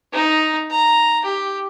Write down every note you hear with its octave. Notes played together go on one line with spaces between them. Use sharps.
D#4
A#5
G4